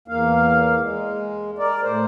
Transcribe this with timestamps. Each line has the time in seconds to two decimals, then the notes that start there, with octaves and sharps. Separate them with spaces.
0.08 E2 A#3 F5
0.80 G#3
1.58 A#4 D5
1.83 A2 C5